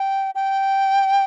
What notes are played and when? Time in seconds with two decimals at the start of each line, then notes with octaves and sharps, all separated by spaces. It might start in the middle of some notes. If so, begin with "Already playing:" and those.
Already playing: G5
0.35 G5